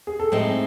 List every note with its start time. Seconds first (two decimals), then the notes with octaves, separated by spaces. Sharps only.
0.07 G#4
0.20 A4
0.32 A2 G#3 C4 D#4 G#4 C5